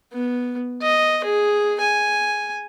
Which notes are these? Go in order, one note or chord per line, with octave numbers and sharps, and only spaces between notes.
B3
D#5
G#4
G#5